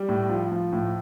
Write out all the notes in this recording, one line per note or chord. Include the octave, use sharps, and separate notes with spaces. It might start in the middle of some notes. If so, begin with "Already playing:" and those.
Already playing: G3
A2
F3
F3
A2